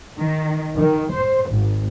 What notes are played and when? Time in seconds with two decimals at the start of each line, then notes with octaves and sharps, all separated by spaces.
0.18 D#3
0.76 D#3
1.12 C5
1.51 G#1